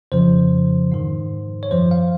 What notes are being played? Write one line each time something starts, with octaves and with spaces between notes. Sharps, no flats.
F2 C#3 F3 C5
G#2 D#3
C#5
F#2 F3 C5
F5